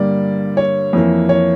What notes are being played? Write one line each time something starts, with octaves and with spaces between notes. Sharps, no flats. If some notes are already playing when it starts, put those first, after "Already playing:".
Already playing: G2 D3 G3 A#3 D5
C#5
F2 E3 A#3
C#5